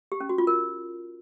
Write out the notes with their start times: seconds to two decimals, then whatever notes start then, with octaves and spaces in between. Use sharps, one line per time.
0.12 G4
0.21 C#4
0.29 F#4
0.38 F4
0.47 A#4